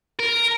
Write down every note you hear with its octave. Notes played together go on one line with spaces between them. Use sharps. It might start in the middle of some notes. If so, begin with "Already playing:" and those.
A#4